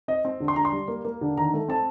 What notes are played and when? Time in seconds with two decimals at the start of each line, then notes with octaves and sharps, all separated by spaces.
0.08 C4 D#5
0.25 C4
0.40 D3
0.48 C6
0.56 D3 A#5
0.65 C6
0.72 G3
0.88 A#3
1.05 A#3
1.21 D3
1.37 D#3 A#5
1.54 A3
1.68 C4 A5